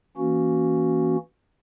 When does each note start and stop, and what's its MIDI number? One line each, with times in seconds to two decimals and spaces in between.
0.17 1.17 52
0.17 1.17 58
0.17 1.17 61
0.17 1.17 66